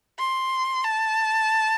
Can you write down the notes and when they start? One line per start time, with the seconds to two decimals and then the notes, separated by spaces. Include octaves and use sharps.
0.19 C6
0.84 A5